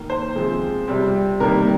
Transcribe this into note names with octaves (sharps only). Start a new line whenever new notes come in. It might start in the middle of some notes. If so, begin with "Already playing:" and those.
Already playing: D#3 A#3
C5
C3 F3 G#3 C4
C3 G3 C4
C3 D#3 G3 A#3 A#4